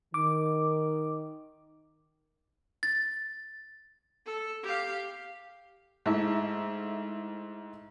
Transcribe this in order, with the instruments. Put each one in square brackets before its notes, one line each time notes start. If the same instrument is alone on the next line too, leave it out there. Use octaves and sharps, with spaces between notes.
[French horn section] D#3 [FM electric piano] D6
[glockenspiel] A6
[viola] A4
G4 F5
[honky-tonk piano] G#2 A3 E4